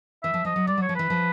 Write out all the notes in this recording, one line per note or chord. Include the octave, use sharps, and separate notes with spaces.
E3 E5
F3
F3 D#5
F#3
G3 D5
F#3 C#5
F3
E3 B4
F3